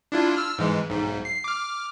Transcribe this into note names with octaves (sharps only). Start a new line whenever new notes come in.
D4 E4 F4
E6 F6
G#2 E3 G#3
B1 G#2
C7
D6 F6